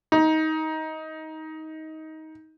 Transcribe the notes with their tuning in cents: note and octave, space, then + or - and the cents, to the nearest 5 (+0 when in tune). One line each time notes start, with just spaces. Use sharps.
D#4 +20